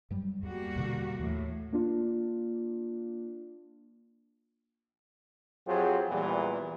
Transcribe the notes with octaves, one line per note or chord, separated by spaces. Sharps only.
G2 F#3 G3
E2 G3 A#3 F#4
E2 B2 D3
D#2 A2 E3
A#3 D4 F4
F2 F#3 F4 G4 G#4 C5
A#1 E2 A#2 E3 G3